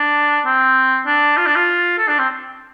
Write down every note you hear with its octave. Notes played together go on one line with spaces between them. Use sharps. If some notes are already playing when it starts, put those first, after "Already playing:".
Already playing: D4
C4
D4
F4
D4
F4
A4
D4
C4